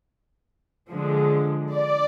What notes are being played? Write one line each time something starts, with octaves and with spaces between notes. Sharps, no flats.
D3 F3 G#3
D5